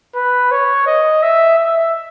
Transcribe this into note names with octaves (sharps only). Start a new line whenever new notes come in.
B4
C#5
D#5
E5
E5